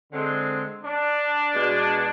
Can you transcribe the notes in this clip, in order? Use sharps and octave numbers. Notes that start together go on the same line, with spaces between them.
D3 G#3 C4
D4
B2 G#3